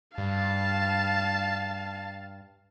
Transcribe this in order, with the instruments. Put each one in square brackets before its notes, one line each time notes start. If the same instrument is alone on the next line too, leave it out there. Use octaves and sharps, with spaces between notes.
[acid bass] G2 [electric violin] F5 A5